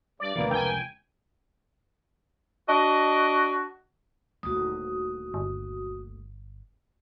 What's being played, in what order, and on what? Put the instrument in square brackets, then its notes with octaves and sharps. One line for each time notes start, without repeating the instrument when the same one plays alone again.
[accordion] G2 [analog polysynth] D5
[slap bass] D2 B2 E3 [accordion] A#3 B3
[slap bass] F1 C#2 [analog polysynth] G5 G#5
[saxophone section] D4 F#4 D#5
[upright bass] D#1 D2 [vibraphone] F#4 D#6
[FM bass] G1